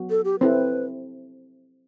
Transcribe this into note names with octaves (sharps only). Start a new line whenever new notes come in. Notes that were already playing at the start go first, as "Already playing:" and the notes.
Already playing: F#3 B3 F#4
A4
G4
C4 E4 A4 B4